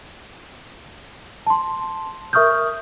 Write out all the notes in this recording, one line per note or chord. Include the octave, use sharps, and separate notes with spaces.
A5 C6
A#4 E5 C#6 D#6 F6 G6